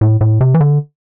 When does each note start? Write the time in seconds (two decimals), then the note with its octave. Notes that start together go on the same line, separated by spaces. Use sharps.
0.01 A2
0.21 A2
0.41 C3
0.54 E3
0.61 D3